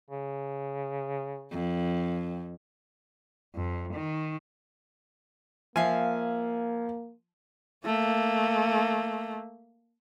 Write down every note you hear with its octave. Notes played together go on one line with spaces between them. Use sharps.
C#3
F2
F2
D#3
F3 A#3 E5 F5 G#5
A3 A#3